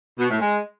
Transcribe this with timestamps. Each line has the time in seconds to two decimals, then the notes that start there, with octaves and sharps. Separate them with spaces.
0.18 B2
0.29 A2
0.40 G#3